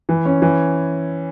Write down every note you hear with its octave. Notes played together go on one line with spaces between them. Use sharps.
E3
C#4
E3